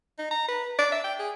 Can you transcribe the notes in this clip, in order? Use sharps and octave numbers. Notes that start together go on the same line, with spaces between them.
D#4
A#5
B4
D5
E5
G5
G#4